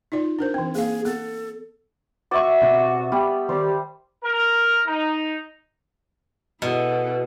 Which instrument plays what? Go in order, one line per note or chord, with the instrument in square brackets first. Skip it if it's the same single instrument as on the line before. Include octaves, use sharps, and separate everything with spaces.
[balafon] D#4 F4 D5
D4 A#4 C5
E3 C4
[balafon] A#3 F5 [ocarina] G#4
[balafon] B3 [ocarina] A4
[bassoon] F#4 [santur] D5 E5 C#6
[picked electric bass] B2 C4
[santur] G3 [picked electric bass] B3
[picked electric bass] D#3 [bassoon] G3 [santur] C5
[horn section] A#4
D#4
[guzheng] B2 [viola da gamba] E4 G#4 A4